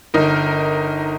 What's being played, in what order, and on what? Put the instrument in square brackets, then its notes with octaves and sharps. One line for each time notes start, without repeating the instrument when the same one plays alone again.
[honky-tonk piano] G1 D#4 A#4